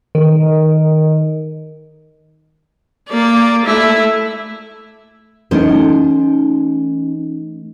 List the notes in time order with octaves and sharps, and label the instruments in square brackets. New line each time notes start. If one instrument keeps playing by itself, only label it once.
[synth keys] D#3
[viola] A#3 D5
A3 E4
[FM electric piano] E3 A3 D#4 [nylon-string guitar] C#4 C5